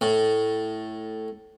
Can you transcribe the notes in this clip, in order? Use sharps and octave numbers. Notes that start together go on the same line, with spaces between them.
A2